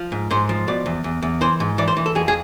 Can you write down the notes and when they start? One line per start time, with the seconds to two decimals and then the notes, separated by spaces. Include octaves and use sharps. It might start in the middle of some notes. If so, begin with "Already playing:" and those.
Already playing: F3
0.12 G#2
0.30 G#2 C5
0.49 F3
0.68 B2 D5
0.86 E2
1.04 E2
1.22 E2
1.41 E3 C5
1.60 G#2
1.78 E3 D5
1.88 C5
1.97 E3
2.06 A4
2.15 F2 G#4
2.28 G#4